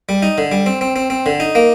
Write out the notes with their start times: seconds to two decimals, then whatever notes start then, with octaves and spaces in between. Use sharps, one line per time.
0.09 G3
0.23 D#4
0.38 D3
0.52 G3
0.66 C4
0.81 C4
0.96 C4
1.10 C4
1.26 D3
1.40 D#4
1.55 A#3